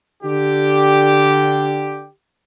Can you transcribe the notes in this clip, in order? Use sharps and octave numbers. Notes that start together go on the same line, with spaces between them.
D3 G4